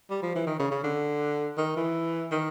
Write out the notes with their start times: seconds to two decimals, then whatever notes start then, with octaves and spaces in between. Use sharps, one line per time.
0.10 G3
0.22 F3
0.35 E3
0.47 D#3
0.59 C#3
0.71 C#3
0.84 D3
1.58 D#3
1.77 E3
2.31 D#3